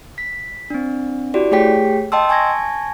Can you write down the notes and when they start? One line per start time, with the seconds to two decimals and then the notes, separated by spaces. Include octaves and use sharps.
0.18 B6
0.70 C4 D4
1.34 E4 F#4 G4 D5
1.51 A3 G4 G#4 C#5 G5 B6
2.12 D#5 G5 A5 C6 E6
2.29 G#5 A5 C#6 G#6 A#6